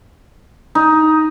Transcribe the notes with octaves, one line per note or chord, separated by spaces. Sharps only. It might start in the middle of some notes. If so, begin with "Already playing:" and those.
D#4